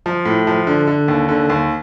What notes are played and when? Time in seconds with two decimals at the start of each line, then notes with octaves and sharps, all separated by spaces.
0.06 F3
0.25 A2
0.47 F3
0.67 D3
0.87 D3
1.08 D#2
1.29 D3
1.50 D#2